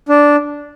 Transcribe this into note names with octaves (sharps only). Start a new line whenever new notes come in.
D4